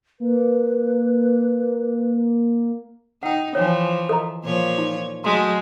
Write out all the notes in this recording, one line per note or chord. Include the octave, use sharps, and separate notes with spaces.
A#3 B4
D#4 F#5 G5
E3 F3 C#5 G5 G#5
A4 D#5 A#5
A#2 F3 C#5
D#4
F#3 G#3 A3 C6